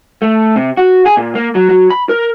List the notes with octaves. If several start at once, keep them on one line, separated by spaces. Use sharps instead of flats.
A3
C3
F#4
G#4
A#2
A#3
F#3
F#3
B5
A#4